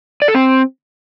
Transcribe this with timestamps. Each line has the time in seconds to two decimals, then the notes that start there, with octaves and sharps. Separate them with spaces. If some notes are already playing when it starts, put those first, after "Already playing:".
0.22 D5
0.28 A4
0.35 C4